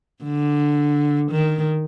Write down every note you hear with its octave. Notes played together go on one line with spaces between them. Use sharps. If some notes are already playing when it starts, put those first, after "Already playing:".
D3
D#3